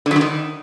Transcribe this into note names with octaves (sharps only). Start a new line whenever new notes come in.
D3
F#3
D3
D#3